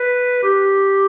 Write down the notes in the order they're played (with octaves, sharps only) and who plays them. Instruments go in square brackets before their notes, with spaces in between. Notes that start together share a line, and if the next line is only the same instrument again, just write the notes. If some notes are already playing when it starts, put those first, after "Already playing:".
Already playing: [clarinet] B4
G4